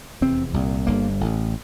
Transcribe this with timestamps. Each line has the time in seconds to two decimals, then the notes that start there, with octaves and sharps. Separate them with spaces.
0.21 F1 E2 C3 C4
0.54 C2 A#2
0.87 G1 G2 D3 A#3
1.21 A1 A2